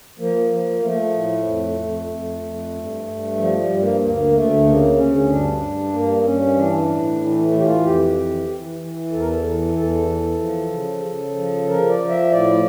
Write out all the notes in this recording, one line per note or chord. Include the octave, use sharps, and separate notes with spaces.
F3 A#3
F3
F3 A3
A2
F2
F2
F2
F2
G2
G2
F3 G3
G3
G2
A#3
D2 A#3
D2 A3
C#3 A#3
D2 C#4
G2 D4
G2
G2 A#3
G2 C#4
E3 D4
A2
E3
A3
E3
G4
F4
F2 G4
E3
E3
E3
E2 A4
A#4
A4
E3
E2 A4
E3
F3
C#3
C#3
F3
F3 A#4
D5
F3
E5
A2 D5